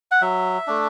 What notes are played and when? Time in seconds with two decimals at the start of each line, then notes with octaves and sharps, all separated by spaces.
0.11 F#5
0.22 F#3 E5
0.67 A3 D4